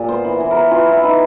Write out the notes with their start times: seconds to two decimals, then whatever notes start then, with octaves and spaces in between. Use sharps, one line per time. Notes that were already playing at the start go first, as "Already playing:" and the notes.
Already playing: A#2 G#4
0.09 B3 C5
0.25 E3
0.40 E3
0.51 B3 A#4
0.71 E3 F4
0.87 B3 E4
1.03 E3 D#4